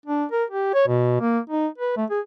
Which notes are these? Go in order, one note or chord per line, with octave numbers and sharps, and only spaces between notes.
D4
A#4
G4
C#5
B2
A#3
D#4
B4
A3
G#4